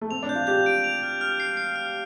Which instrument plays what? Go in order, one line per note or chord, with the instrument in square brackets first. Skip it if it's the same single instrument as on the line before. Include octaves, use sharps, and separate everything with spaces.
[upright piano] A3
[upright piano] C4 [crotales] F7
[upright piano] D4
[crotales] G6
[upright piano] F4
[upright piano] G4 [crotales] G6
[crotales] D7
F7
F6
F6
C7
C7
F6